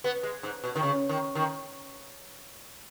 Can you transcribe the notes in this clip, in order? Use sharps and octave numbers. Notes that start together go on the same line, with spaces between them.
B3
G#3
G#2
B2
D#3
C#3
D#3
D#3